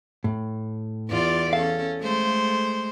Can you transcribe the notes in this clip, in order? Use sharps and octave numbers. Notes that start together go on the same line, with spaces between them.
A2
E2 F4 D5
C#4 A4 F5
G#3 A3 C5